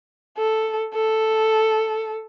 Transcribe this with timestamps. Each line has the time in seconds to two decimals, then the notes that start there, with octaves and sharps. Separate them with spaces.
0.38 A4
0.94 A4